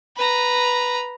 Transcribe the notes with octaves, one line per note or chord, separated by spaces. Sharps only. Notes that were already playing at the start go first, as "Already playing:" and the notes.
B4 A#5